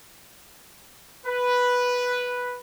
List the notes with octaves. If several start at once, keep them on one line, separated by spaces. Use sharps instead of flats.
B4